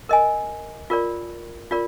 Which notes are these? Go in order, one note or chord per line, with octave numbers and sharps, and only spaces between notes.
A#4 D#5 G#5
F4 A#4 D5
F4 A#4 D5